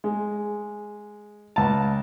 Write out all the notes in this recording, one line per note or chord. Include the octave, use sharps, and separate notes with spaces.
G#3
C#2 A5